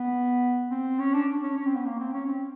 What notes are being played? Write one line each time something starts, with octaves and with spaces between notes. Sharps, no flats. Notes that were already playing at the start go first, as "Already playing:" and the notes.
Already playing: B3
C4
C#4
D4
C#4
C#4
C4
B3
A#3
C4
C#4
C4